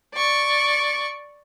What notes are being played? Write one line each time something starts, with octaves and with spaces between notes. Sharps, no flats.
D5 C#6